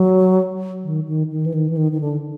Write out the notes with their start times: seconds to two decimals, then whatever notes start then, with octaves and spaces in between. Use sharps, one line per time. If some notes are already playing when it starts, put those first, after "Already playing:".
Already playing: F#3
0.84 D#3
1.07 D#3
1.30 D#3
1.46 E3
1.54 D#3
1.70 E3
1.77 D#3
1.92 D#3
2.01 D3